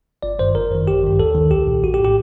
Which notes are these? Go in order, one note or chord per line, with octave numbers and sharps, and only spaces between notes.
G1 D5
G2 D#3 C5
G1 A#4
F#2 D#3
A1 G4
G2 D#3
D#2 A4
D#3
C2 G4
A#2
A#1 F#4
G4
A2
G4